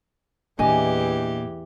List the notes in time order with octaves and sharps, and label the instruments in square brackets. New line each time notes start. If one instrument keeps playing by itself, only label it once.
[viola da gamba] E2 E3 G4 [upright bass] A#2 [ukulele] D4 D#5 G#5